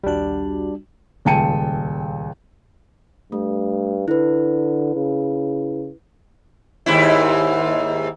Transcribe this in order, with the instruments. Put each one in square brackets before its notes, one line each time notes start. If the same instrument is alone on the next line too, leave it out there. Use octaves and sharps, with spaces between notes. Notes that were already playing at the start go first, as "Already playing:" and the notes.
[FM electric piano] A#1 D#2 F#4 [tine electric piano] G3 D4
[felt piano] D#1 C#2 G5 A5 C#7 D#7
[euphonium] G2 [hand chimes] A3
[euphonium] D3 [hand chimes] E4 B4
[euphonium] C#3
[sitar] D#2 G#2 E4